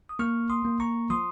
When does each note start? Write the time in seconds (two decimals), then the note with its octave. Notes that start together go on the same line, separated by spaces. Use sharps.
0.09 D#6
0.19 A#3 C#6 F6
0.50 C6 D#6
0.65 A#3
0.80 A#5 C#6
1.10 F3 C6 D#6